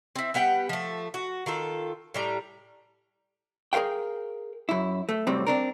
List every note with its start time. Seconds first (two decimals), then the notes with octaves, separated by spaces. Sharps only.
0.16 C4 E4
0.34 G3 B3 F#5 G5
0.69 F3 A3
1.14 F#4
1.46 D#3 F4 A4
2.14 A2 G3 A#5
3.73 G#4 A#4 C#5 F5 G5
4.69 F#2 E4
5.09 A3
5.27 F#2 A2 C3 F#3 G3 C4
5.47 C4 D4 A#4